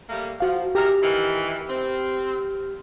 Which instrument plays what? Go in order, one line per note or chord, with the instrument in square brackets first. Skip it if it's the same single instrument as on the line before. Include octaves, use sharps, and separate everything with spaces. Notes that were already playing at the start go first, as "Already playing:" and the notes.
[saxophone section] G3 A3 A#3
[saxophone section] F3 [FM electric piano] F#4 F5
[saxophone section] E4 G#4 A#4 [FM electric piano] G4 F6
[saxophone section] D#3 E3
C4